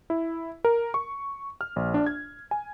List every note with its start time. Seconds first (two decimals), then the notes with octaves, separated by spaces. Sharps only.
0.10 E4
0.65 A#4
0.94 C#6
1.61 F6
1.76 A#1
1.94 D4
2.06 G#6
2.51 G#5